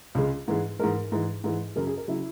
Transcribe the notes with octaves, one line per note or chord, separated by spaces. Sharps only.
C#2 C#3 G#3
G#2 E3 G#3
G#2 E3 G#3 A#4
G#2 E3 G#3
G#2 E3 G#3
F#2 C#3 F#3 A#4
G#4
A#4
C#3 F#3 E4